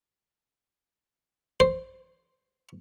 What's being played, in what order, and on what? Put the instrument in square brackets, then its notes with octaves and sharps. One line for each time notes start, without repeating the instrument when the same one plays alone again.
[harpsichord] C5